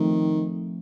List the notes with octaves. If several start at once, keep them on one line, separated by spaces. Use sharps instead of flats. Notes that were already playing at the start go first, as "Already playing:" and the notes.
Already playing: D#3 F3 A3 C4